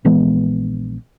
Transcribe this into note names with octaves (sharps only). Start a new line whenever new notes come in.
A#1 E3 G#3 B3